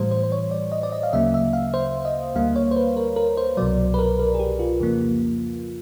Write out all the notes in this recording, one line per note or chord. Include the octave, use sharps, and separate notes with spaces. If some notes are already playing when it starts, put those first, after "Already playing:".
Already playing: A2 E3 G3 C5
C5
C5
C#5
D5
D#5
D5
D#5
F5
D2 C#3 F#3 A#3 E5
E5
F5
C5
D#5
D2 D3 G3 A#3 F5
C#5
C5
B4
A#4
A#4
C5
C2 B2 F#3 D5
B4
A#4
A#4
G#4
G4
F4
F2 C#3 F3 A#3